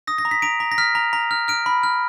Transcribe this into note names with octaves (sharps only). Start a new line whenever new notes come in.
D#6 A#6
A#6
A#5
B6
A#5 D7
A#5
A#6
F6 B6
A#5
A#5
F6
F6 D7
B5
F6